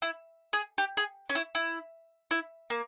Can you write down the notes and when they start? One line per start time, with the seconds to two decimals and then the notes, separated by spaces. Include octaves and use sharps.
0.02 E4
0.53 G#4
0.78 G4
0.97 G#4
1.30 C#4
1.35 E4
1.55 E4
2.31 E4
2.70 A#3